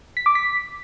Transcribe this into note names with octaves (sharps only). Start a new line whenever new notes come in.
B6
D6
B6